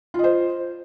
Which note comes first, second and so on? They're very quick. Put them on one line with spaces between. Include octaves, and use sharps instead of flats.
F4 D#5 C5